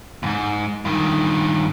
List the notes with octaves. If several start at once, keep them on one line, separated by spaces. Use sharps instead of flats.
D#2 G#2
G2 D#3